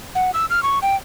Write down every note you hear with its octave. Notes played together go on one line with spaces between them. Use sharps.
F#5
E6
F6
C#6
G5